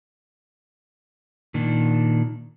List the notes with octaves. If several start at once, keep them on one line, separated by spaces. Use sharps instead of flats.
A#2 D#3 D4